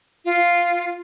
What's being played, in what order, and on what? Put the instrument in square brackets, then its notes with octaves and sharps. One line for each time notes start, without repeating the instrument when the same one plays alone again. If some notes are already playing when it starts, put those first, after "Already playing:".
[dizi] F4